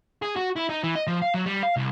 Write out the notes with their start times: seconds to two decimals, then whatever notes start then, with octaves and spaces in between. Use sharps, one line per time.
0.22 G#4
0.36 F#4
0.56 E4
0.69 D#4
0.83 E3
0.96 D#5
1.07 F3
1.22 F5
1.34 F#3
1.46 G3
1.63 F5
1.76 C2